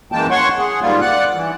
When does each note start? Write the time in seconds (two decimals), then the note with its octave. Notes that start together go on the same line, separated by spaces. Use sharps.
0.12 F#2 E3 G#3 A#3 G5 A5
0.31 C#5 F#5 C6 C#6
0.59 G#4 F#5
0.81 G#2 G3 A#3 F4
1.01 D5 F#5 F#6
1.34 E3